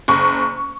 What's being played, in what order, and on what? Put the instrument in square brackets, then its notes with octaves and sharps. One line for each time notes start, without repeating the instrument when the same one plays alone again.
[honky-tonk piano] F#1 C#6